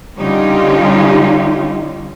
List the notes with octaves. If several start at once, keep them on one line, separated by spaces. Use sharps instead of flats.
D3 G3 C#4 D#4 F4 G4